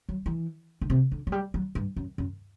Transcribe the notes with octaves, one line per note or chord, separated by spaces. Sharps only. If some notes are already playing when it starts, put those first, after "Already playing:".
F#3
E3
D3
C3
D3
F#3
G3
F#3
G2
F#2
F#2